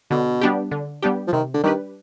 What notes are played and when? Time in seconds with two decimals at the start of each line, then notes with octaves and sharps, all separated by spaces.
0.11 B2 D3
0.41 G3 B3 D4 G4
0.71 D3
1.02 G3 B3 D4 G4
1.27 F3
1.33 C3 D#3
1.54 D3
1.64 D#3 G3 D4 G4 B4